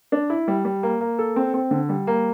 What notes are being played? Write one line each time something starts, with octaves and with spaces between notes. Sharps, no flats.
D4
E4
G3
G3
A#3
A#3
A4
C4
C4
D3
G3
A#3